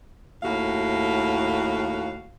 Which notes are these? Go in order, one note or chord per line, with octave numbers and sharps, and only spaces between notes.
D#2 A2 F#4 F5